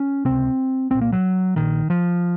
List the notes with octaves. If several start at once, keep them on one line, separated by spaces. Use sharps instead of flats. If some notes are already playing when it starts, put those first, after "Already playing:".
Already playing: C#4
C#2 C3 C4
C2 A#2 C4
A#3
F#3
A#1 A#2 D#3
F3